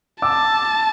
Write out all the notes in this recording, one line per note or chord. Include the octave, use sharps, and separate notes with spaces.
A5 D6 E6